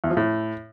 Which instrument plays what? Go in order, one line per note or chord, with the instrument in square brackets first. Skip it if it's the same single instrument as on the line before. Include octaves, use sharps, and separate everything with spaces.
[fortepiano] E2
F3
A2